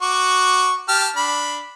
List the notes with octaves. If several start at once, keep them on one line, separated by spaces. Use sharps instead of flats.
F#4 C#6 D6
G4 A5 F6
D4 B5